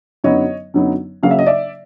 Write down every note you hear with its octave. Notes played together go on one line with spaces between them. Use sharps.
F#2 D3 F#3 B3 D#4 C#5 D#5
F#2 D3 F#3 B3 D#4
C#3 F#3 A#3 F5
E5
D#5
D5 E5